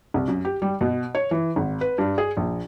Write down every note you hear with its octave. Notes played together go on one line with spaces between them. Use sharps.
C2
F#2
G4
G3
B2
C#5
E3
G#1
B4
G2
G#4
A#1